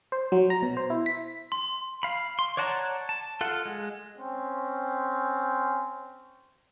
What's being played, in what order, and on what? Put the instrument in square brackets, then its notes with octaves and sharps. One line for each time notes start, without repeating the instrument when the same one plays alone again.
[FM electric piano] C5
F#3
A#5
B2
C5
E4
B6
[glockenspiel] C6
[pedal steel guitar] F5 B5
C6
C#5 D5 F#5 A5 A#5
A5
F4 A4 F5 F#5
G#3
[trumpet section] C4 C#4